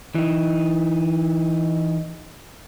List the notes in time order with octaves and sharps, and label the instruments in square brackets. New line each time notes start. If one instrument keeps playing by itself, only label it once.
[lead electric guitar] E3 D#4